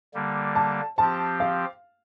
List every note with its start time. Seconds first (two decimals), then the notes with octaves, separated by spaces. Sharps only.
0.14 D3 G3 A#3
0.56 A5
0.98 F3 C4 G4 A5
1.40 F5